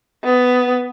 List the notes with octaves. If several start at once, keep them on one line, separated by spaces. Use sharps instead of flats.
B3